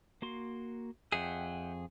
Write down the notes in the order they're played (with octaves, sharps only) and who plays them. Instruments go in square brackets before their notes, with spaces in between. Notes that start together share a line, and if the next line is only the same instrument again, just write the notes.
[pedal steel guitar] A#3 F#4 C6
[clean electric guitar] F2 G#4 [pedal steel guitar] E5 F#5 G5